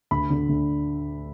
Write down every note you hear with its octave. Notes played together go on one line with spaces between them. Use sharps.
D2 B5
D3
D2